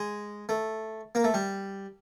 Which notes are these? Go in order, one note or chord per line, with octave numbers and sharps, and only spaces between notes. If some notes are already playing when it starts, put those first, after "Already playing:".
Already playing: G#3
A3
A#3
A3
G3